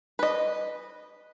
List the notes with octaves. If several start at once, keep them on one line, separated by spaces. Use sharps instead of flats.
B4 D#5